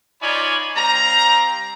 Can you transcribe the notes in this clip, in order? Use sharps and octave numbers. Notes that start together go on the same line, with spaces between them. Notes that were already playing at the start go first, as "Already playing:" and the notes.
D#4 F4 C#5 D5 G#5 B5
G3 C4 F5 A#5